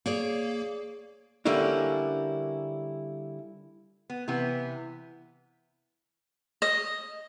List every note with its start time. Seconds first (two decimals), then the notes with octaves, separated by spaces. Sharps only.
0.06 A#3 G#4 C#5 D5
1.45 D3 G3 A#3 C#4 E4
4.10 B3
4.28 C3 E3 B3
6.62 D#5